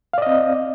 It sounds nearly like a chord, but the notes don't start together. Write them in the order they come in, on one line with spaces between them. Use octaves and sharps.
F5 D5 D#5 C4